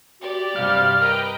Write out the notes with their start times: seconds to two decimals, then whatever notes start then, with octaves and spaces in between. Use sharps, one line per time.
0.21 F#4 G4 D5
0.56 G2 C3 G3 F5 F6
1.00 A#4 B4 D#5 G5 A#5